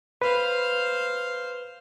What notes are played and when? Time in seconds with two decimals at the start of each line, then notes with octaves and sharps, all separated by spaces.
0.22 B4 C5 F5